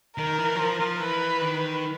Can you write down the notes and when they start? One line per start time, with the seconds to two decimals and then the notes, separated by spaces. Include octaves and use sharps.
0.17 D#3 A#4
0.38 E3
0.55 F#3
0.59 F3
0.80 F3
1.00 E3 B4
1.41 D#3